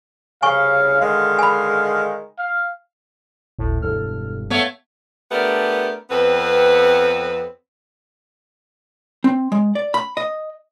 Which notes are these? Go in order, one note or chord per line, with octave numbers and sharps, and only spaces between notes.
C2 C#3 F5 G#5 C#6
D3 D#3 G#3 F5
G#5 B5
F5
G1 D2 A2
E1 G2 A4 F6
A3 B3 C#5 F5 F#5
A3 B3 D4 G4 A#4
F2 B3 C4 B4
C4
G#3
D5
B5
D#5